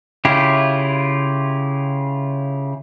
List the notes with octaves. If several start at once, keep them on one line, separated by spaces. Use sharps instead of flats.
C#3 E4 F4 G4